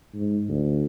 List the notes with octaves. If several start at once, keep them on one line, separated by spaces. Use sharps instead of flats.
G#2
D2